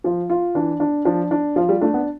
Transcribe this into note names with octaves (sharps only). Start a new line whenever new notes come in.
F3 F4
F4
E3 D4
D4
F3 D4
D4
F3 F4
G3
A3 D4
B3